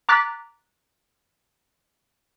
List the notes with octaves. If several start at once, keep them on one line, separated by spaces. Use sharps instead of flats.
A#5 D6 F#6 A6 B6